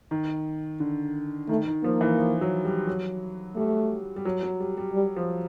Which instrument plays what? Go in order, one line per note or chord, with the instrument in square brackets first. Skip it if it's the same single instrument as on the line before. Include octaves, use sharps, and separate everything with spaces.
[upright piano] D#3
D3
[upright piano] D#3 [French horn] A3
[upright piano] D#3
[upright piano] F3 [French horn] A#3
[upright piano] E3
F3
F#3
G3
F#3
[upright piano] G3 [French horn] A3
[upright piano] G3
F#3
F#3
G3
G3
[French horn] G3
[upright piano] F3